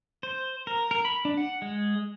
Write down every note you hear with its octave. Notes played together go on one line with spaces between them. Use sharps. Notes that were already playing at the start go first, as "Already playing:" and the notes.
C5
A#4
A#4
B5
D4
F#5
G#3